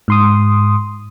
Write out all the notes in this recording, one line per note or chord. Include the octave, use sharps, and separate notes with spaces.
G#2 C6 D#6